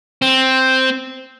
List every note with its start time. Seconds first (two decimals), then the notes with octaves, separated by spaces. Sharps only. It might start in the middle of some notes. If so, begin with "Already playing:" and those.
0.22 C4